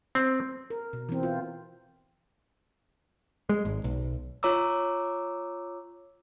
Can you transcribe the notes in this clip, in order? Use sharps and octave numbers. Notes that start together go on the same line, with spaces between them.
C4
A#4
B2
E3 C4
F4
G#3
G#1
B1
F4 C#5 A#5 D6 E6